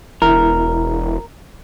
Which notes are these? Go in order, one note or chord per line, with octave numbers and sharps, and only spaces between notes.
E1 E4 A#4